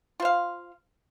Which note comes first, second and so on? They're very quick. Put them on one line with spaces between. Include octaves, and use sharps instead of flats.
F4 C5 F5